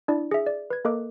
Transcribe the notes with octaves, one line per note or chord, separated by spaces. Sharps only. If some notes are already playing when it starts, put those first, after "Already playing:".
D4 E4 D5
G#4 E5
D5
B4 G#6
A#3 A4 A#4 D#5 D6 F#6